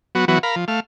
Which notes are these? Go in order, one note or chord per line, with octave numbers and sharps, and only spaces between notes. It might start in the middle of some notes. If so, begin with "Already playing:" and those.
F#3 B3 F#4
E3 F#3 B3 F#4
A#4 F5 B5
F3
A3 F5